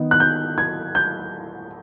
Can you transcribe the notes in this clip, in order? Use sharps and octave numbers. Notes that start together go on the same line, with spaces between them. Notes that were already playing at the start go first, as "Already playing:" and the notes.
Already playing: D#3 B3 D#4
F#6
G6
G#6
G6